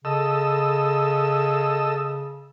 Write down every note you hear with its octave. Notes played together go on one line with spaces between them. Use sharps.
C#3 A4 D#5 E6